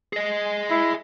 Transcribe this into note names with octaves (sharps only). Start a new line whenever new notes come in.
G#4 D#5
E4